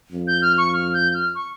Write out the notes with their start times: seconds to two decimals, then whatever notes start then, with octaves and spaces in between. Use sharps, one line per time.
0.12 F2
0.27 G6
0.42 F6
0.58 C#6
0.73 F6
0.94 G6
1.14 F6
1.35 C#6